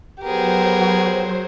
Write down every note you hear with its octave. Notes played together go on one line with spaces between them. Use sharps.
F#3 B3 G4 G#4 A#4 C5